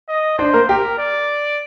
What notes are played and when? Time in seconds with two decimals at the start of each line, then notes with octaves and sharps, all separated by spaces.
0.09 D#5
0.38 D4 C5 D5
0.54 A#3 A#4
0.68 G4 A#4
0.98 D5